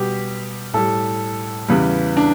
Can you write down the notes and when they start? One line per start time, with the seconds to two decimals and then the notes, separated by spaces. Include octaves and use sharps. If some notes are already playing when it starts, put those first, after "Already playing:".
Already playing: B2 G3 G4
0.73 A2 G3 A4
1.68 E2 C#3 E3 G3 B4
2.17 D4